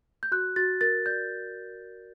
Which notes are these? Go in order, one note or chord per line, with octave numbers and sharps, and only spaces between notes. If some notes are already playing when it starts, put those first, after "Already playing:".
G6
F#4 F#6
F#4 A6
A#4 A6
D5 G6